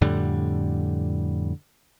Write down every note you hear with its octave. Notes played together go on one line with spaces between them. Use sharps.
F2 A2 D3 G3